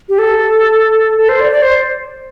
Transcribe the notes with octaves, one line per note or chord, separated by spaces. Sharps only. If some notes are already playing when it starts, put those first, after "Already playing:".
G4
A4
A4
C5
D5
D5
C5